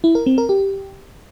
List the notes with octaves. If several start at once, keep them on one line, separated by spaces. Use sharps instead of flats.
E4
A#4
C4
A#4
G4